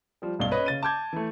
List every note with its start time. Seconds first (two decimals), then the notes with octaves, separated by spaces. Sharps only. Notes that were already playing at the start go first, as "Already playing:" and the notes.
0.22 F3 G3
0.39 D#1 B1 G2 F5 G7
0.51 C#4 B4 D#5
0.66 C#3 A6 D#7
0.83 A5 D6 G6 G#6
1.13 E3 A3